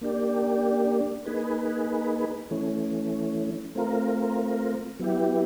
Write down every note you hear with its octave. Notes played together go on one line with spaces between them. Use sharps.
A#3 D4 G4
A#3 D#4 G#4 B4
E3 A3 C#4
A3 C4 F4 A#4
F#3 B3 E4 G4